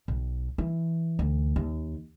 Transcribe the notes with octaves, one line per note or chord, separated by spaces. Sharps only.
B1
E3
D2
D#2